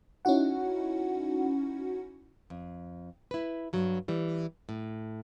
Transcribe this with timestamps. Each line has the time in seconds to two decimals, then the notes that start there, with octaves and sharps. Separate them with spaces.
0.25 C#4 D#4 E4 F#4 F#5
2.50 F2
3.31 E4 B4
3.73 G2 F#3
4.08 E3 G3
4.69 A2